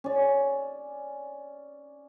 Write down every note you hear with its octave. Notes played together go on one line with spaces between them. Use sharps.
C#4 D5